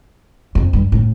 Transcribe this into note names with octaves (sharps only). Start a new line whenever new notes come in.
F2
G2
A2